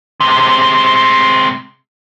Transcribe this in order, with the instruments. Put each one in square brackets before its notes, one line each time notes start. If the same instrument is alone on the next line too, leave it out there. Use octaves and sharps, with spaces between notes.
[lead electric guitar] C3 G#3